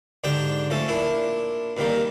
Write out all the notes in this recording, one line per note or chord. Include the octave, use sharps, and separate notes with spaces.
G#2 D3 D4 G4 G5
F3 A3 C#4 A4
A#2 D4 E4
F2 A#2 D#3 G3 A#3